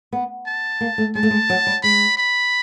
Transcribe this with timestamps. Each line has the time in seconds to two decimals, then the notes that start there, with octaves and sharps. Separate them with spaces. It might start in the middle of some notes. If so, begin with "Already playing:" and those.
0.12 B3
0.47 A5
0.81 A#3
0.98 A3
1.15 G#3 A5
1.23 A3
1.31 G#3
1.50 F#3
1.67 G3
1.83 G#3 B5
2.17 B5